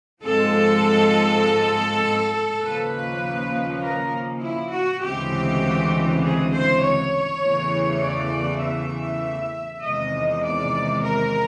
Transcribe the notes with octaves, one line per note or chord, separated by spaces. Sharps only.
G#2 F3 G#3 C4 A4
D#2 C#3 F3 A#3 C#4 B4
A#4
E4
F#4
D2 C#3 E3 G#3 C4 G4
G#4
C5
C#5
E2 C#3 E3 A3
D5
E5
E2 C3 D#3 G#3 D#5
D5
A#4